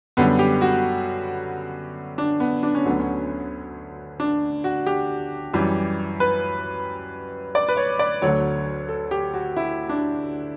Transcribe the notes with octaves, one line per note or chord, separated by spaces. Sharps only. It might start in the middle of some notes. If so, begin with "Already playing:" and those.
F#2 D3 G3 B3
G4
F#4
D4
B3
D4
C#4
D2 D3 F#3 B3
C#4
D4
F#4
G4
F#2 E3 G3
B4
D5
B4
C#5
D5
D2 D3 F#3 C#5
A4
G4
F#4
E4
D4